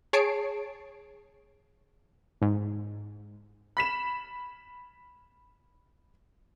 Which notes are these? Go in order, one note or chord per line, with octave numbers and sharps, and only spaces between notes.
G#4 C#5 A5 C7 D7
G#2
B5 B6 E7